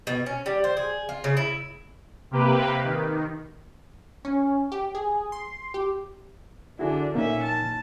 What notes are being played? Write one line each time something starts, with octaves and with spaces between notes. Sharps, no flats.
B2
C#4
G3
C5
G#4
F4
C#3
E4
C3 A#3 G4 B4
D#3
C#4
G4
G#4
C6
G4
D3 D4 E4 F#4 G#4
A#2 A#3 C#4 D#4 E5
A5